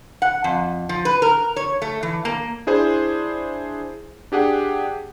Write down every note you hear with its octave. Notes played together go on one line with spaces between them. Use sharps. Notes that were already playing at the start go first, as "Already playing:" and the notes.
F#5
F2
F3
B4
A#4
C#5
A3
E3
A#3
D4 E4 G#4 C5
D4 G4 G#4 F#5